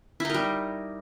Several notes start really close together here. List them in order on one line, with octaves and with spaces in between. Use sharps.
E4 D#4 A#4 G3